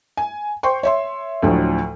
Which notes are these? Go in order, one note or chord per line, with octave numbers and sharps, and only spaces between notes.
G#5
C5 G5 C6 C#6
C#5 E5 C6
D2 A2 D3 F3 F#3